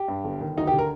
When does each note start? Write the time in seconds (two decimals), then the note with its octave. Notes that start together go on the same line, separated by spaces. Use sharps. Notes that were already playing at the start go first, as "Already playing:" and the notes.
Already playing: G4
0.08 G2
0.24 G1
0.41 D#3
0.57 D2 D#4
0.67 G4
0.73 D3
0.79 A#4